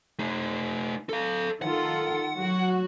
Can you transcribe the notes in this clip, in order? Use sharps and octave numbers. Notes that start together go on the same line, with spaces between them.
A3 D#4
A4 F5
D#3 F4 A4 F#5
F#3 F#4